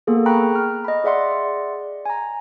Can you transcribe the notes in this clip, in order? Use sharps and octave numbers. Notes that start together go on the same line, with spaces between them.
A#3 B3 G#4 A4
G5 A#5 B5 C#6 F#6
F6
D#5 B5
G#4 D5 E5 F#5 C6
G#5 A#5